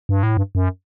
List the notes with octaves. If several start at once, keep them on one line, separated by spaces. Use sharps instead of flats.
G2
A2
G2
F#2